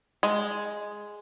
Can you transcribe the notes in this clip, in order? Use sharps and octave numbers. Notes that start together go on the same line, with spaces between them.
G#3